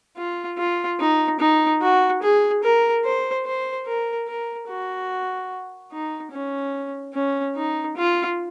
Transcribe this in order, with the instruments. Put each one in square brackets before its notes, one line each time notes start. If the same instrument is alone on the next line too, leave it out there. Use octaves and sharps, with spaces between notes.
[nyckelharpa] F4
F4
D#4
D#4
F#4
G#4
A#4
C5
C5
A#4
A#4
F#4
D#4
C#4
C#4
D#4
F4